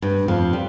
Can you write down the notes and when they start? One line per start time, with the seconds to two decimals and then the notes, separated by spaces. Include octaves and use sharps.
0.02 G2
0.28 F2 F3
0.53 G3